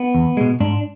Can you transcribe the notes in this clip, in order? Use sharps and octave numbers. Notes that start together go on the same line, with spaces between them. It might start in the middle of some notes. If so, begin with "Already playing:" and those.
Already playing: B3
E2
B2 G#3
G#2 D4